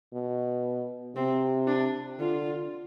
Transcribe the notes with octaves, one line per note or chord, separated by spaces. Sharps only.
B2
C3 C4
D4
D3 F4